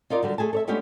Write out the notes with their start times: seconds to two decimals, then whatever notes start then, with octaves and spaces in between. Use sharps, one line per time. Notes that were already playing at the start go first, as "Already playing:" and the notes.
0.10 D#4 F4 A#4 D5
0.23 D3 F#3 G3
0.38 A3 G#4 G#5 A5
0.53 A4 C#5 E5
0.67 G#3 A3 B3 C#4 D4 G4